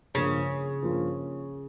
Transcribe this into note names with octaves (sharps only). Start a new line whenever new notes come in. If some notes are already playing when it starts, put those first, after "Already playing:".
G2 C#3 F3 A#3 F4
G2 F3 A#3 F4